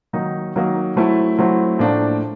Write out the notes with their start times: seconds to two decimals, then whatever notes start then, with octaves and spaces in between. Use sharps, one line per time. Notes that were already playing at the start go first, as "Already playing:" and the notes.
0.13 D#3 F#3 A#3 D#4
0.56 D#3 F#3 A#3 D#4
0.96 F#3 A3 C4 E4
1.39 F#3 A3 C4 E4
1.79 A2 F3 A#3 D4